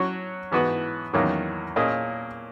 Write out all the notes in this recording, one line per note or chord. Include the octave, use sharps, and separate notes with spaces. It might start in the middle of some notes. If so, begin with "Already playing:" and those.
Already playing: F#3 C#4 F#4 C#5
G#2 E3 B3 F#4 B4
E2 D#3 F#3 A#3 C#4
A#2 A#3 C#4 G#4 D#5